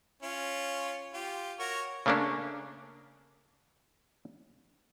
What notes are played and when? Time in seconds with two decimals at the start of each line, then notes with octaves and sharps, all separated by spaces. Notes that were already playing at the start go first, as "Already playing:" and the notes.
0.23 C#4 F4
1.14 F4 G4
1.59 F#4 A#4 C#5
2.06 C#3 A3 A#3 C#4 D4